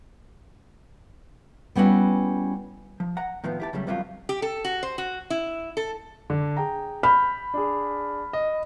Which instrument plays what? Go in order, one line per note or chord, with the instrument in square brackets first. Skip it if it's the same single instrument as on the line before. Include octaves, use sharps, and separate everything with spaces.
[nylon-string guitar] G3 B3 C#4 E4 F#4
[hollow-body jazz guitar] F3
F#5 A#5
A2 D#3 F3 B3
E4 G4 A5
C#3 F#3 G3 A3
G2 C3 D#3 F#3 G3 F4
[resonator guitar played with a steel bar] G4
A4
F#4
C5
F#4
E4
A4
[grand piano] D3
G#4 G5 A#5
[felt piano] B5 [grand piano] F6 G6
[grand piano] D4 G#4
D#5